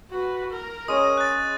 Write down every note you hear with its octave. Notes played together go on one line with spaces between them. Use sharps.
F#4 B4
A#4
G#3 C#4 D#6 D#7
F#6 A6